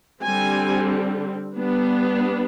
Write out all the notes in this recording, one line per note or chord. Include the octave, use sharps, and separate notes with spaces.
D3 G3 C4 G#5
G3 B3 D4